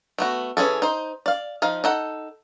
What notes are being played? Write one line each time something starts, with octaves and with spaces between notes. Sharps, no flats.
A3 B3 F#4
E3 C#4 G#4 A4
D#4 C5
D5 F5
F3 D#4 F5
D#4 A4 F#5